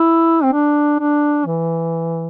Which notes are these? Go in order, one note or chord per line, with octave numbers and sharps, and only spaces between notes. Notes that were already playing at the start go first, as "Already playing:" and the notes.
Already playing: E4
C4
D4
D4
E3